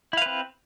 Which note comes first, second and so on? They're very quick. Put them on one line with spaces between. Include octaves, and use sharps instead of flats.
E4 F5 B4 C4